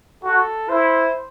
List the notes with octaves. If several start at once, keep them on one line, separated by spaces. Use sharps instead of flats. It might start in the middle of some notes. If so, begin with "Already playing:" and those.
F#4 A4
E4 C5